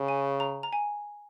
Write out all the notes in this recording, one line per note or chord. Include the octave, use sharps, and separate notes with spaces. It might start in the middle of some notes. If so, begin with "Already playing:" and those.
Already playing: C#3
G#5
A#5
A#5
G#5